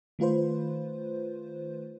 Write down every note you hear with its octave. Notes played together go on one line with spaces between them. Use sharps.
D#3 A3 F4 B4 C5